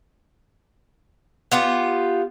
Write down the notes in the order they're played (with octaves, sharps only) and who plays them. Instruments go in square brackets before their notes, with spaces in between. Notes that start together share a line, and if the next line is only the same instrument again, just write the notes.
[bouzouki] B3 F4 G4